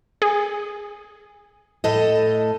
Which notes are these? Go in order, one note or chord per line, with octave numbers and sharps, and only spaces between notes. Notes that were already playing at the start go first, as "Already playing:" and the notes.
G#4
A2 A4 D#5